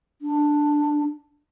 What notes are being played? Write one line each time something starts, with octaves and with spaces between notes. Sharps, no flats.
D4